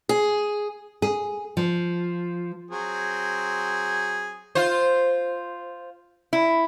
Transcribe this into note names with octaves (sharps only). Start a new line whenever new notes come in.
G#4
G#4
F3
F#3 C4 G#4
F4 C5
E4